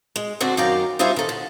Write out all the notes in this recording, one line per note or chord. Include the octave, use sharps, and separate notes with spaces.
G#3
D3 C4 D4 F#4
F#2 D#3 D5 F5 G5 A#5
G3 D#4 F4 C5 E5 G#5
D#3 A4
D3